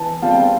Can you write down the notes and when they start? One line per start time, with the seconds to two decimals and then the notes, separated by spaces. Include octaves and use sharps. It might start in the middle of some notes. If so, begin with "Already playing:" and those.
Already playing: E3 A5
0.22 G3 C4 F4 A5
0.31 G5
0.39 A5